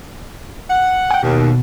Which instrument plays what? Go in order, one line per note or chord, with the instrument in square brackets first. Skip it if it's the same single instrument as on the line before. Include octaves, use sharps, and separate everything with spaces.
[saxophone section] F#5
[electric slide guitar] G5 G#5
[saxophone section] D#2 [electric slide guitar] B2